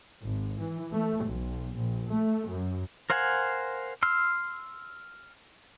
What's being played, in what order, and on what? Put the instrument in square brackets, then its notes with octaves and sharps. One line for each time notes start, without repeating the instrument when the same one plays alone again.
[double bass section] G#1
E3
A3
B1
A#1
A3
F#2
[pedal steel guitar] A#4 C5 F5 F#5 G#5
C6 E6 F6